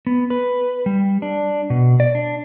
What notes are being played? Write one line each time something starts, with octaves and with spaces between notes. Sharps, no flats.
B3
B4
G3
D4
B2
D5
D4